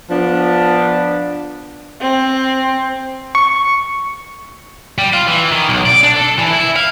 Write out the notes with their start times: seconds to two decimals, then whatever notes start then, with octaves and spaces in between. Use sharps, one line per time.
0.10 F3 B3 D4
2.00 C4
3.35 C#6
4.98 G3
5.13 F4
5.27 E3
5.51 D#3
5.69 B1
5.86 D5
6.03 D4
6.16 A4
6.38 E3
6.50 E4
6.76 F5